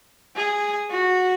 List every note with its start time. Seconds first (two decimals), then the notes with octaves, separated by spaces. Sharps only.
0.37 G#4
0.91 F#4